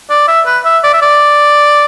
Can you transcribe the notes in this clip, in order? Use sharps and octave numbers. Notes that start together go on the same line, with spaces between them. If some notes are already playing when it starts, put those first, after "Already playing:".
D5
E5
B4
E5
D5
E5
D5